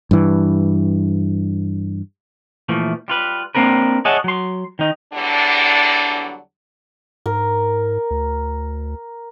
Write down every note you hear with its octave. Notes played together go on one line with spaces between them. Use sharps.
G2 E3
A#2 E3 F3 A3
G3 F4 B4
A#3 C4 D4 A#4 B4
G#4 C#5 D#5 E5 F#5 A5
F#3 C6
D#3 D#4
E2 D3 F#3 G3 D4
G#2 A#4
D2